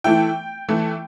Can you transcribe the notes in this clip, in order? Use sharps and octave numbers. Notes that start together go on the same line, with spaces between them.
E3 A3 E4 G5
E3 A3 E4